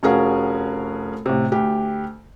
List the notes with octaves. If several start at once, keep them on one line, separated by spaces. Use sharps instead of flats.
F1 C#4 F#4 G#4 A#4 F5
A1 C3
D2 G4